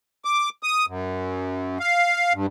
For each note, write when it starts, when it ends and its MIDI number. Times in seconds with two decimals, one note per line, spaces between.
0.25 0.49 86
0.63 0.86 87
0.87 1.78 42
1.80 2.33 77
2.33 2.46 43